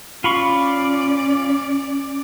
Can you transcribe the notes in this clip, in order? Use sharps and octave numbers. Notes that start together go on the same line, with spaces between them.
C#4 F4 D5 B5 C#6